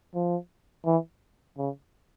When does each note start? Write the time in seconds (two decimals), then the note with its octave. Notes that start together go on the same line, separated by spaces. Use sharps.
0.15 F3
0.86 E3
1.58 C#3